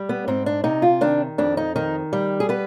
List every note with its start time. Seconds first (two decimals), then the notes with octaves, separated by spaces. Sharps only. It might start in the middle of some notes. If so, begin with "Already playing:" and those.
Already playing: G3
0.09 B3
0.28 G#2 C4
0.46 D4
0.64 C3 D#4
0.82 F4
1.01 D#3 D4
1.38 F2 D4
1.57 D#4
1.76 D#3 D#4
2.13 G3
2.40 G#4
2.49 B3 B4